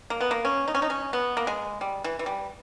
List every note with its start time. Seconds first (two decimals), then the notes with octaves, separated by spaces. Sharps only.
0.10 A#3
0.21 B3
0.31 A#3
0.45 C#4
0.68 D#4
0.75 C#4
0.82 D#4
0.90 C#4
1.13 B3
1.37 A#3
1.47 G#3
1.81 G3
2.04 E3
2.19 E3
2.26 G3